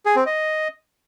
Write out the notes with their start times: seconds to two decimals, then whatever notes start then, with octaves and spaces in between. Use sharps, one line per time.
0.06 G#4
0.16 C4
0.26 D#5